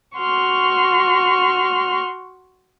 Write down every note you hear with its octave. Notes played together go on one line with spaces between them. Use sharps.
F#4 C6 C#6 F6